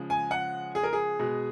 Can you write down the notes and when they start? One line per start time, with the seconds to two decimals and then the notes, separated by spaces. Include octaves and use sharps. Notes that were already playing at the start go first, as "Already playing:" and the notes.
Already playing: C#3 F3 G#3
0.10 G#5
0.31 F#5
0.75 G#4
0.83 A#4
0.93 G#4
1.19 B2 G#3